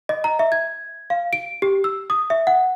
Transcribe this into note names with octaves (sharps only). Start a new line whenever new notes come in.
D#5
A#5
E5
G#6
F5
D7
G4
E6
D#6
E5
F#5